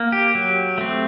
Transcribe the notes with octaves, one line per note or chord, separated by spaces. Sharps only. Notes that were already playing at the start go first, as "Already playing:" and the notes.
Already playing: A#3
G4
F#3
A3 C4